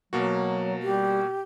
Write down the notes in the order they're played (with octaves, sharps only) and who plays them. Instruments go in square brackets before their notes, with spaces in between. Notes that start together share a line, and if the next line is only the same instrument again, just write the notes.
[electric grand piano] B2 A#3 F#4 [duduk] F#3
[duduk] G3 [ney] G4